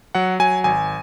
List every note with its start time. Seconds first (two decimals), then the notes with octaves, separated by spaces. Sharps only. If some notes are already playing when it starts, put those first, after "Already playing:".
0.15 F#3 F#5
0.40 F#3 G#5
0.64 G#1 G#5